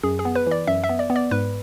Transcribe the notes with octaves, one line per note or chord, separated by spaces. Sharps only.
F#2 G#4
G#4
B3
B4
E3 D5
F#2 E5
E5
B3
D5
B3
D5
G#2 B4